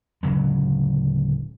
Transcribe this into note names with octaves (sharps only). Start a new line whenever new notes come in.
D1 C#3 F#3 G#3